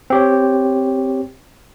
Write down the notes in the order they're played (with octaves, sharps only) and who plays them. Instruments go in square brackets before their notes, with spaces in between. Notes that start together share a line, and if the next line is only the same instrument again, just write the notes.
[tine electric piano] C4 G4 C#5